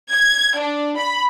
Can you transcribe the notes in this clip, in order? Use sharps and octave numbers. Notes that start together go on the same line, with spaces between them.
G#6
D4
B5